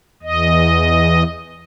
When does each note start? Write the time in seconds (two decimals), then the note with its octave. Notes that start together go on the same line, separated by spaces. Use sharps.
0.23 E2 D#5